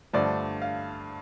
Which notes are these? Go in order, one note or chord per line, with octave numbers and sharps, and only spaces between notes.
G2 D3 F3 A3 D5
F5